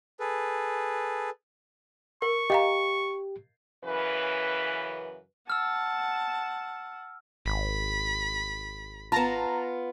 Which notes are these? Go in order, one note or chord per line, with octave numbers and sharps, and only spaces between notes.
G#4 A4 B4
A#4 C#6
G4 D#5 F5 A#5
F#2 C#3 E3 B4
F#5 A5 E6 F6
G#1 B5
B3 F4 A5 A#5